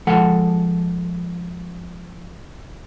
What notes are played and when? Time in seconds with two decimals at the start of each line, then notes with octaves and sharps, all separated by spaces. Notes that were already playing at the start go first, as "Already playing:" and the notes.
0.07 F3 G#3 A4 F#5